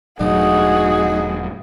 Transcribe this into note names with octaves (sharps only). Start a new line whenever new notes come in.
E1 A2 F#3 D#4 F#4 G#4